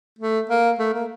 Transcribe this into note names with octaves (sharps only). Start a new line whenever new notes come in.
A3
A#3
A3
A#3